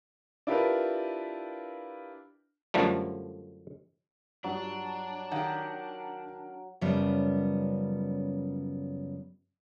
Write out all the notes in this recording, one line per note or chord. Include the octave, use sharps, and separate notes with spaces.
D4 E4 F4 G4 A#4 B4
F#2 D3 F3 G3 A3
G2 F#3 D4
D#3 G4 F5 F#5 F6
F#2 C#3 F3 G3 B3